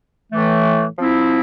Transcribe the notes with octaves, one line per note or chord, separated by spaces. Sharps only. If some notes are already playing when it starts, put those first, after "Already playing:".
A2 E3 A3
F3 C4 E4